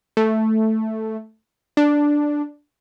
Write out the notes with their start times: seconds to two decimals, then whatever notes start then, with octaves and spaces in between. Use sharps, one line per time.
0.17 A3
1.77 D4